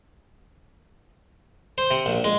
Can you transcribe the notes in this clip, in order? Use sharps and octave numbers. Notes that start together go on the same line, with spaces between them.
C5
C3
A#1
G#3